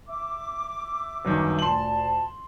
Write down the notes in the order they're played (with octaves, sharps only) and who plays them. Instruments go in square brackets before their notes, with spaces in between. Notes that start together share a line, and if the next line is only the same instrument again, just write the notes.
[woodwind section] E5 D6
[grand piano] G1 F#2 D#3
[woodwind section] D2 A#2 A5 [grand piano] C6 F#7